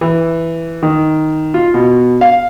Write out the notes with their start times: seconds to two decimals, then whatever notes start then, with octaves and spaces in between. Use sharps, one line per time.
0.01 E3
0.83 D#3
1.54 F4
1.74 B2
2.21 F5